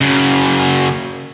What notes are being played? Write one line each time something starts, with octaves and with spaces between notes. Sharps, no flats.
F#2 C#3